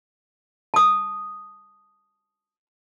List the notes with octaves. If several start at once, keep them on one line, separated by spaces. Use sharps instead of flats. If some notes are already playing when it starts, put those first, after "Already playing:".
A5 D#6